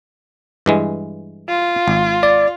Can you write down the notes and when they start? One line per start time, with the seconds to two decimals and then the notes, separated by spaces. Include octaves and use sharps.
0.66 G2 E3 G#3
1.49 F4
1.88 G#1
2.23 D5